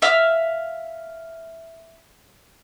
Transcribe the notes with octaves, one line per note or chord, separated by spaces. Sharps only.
E5 F5 F6